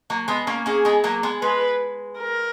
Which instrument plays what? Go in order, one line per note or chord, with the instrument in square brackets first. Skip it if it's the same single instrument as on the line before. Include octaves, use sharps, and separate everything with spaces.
[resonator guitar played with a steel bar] F#3 A#3
G#3 B3
A#3 C#4
[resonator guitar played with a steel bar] A#3 C#4 [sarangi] G#4
[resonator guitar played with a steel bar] G#3 B3
F#3 A#3
G#3 B3
[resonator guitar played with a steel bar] G#3 [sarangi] B4
[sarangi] A#4